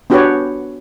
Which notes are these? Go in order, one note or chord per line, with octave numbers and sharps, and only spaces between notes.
B3 D4 F#4 G4 B4 C#5